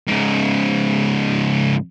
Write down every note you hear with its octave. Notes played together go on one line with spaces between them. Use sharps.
G#2 C#3